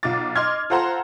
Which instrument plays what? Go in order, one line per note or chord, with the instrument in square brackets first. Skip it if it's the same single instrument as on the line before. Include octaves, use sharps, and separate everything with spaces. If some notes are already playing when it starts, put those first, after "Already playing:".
[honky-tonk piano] B1 F4 D6 A6
D#5 C6 D6 F6 G#6
F4 A4 C5 F#5 A#5 C6